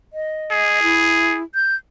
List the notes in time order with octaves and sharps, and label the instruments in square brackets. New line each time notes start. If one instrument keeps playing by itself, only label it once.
[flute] D#5
[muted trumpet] G#4
[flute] E4
G6